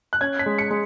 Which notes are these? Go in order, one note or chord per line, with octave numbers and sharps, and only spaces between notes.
F#6
C#4 G#6
B6
G#3
C#7
G#3